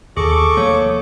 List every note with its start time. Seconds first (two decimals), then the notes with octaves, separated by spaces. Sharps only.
0.17 D#2 G#4 A4 C#6 D6
0.57 F3 A3 A#3 C#5